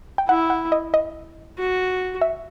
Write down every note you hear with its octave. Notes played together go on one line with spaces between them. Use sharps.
G5
E4 F#5
F#5
D#5
D#5
F#4
E5